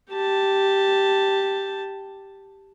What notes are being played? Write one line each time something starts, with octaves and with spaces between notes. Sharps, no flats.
G4 A5